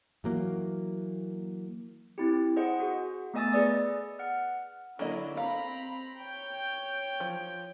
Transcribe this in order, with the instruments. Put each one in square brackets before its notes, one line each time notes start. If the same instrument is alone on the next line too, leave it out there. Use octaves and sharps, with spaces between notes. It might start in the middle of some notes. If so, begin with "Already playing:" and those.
[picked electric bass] E3 F#3 A#3
[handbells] C4 E4 G4
G#4 C5 D#5 F#5
F#4 G#4
A3 B3 D#5 G#5 E6 A6
G#4 B4 D5 D#6
F#5 F6
[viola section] D3 E4 [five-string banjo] F#3 A#3 D#5
[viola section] C4 A#5 B5 [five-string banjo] F5
[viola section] C#5 G5
[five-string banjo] F3